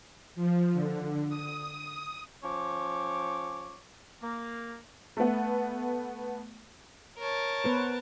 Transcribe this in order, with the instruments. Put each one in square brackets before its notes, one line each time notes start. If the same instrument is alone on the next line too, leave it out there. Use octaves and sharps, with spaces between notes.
[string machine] F3
D3
D#6
[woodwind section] F3 C#4 C#5 D6
A#3
[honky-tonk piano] A3 B3
[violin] A#4 A5 [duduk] C#5
[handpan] B3 B4 C5